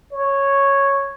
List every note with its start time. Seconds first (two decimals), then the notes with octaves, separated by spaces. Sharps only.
0.12 C#5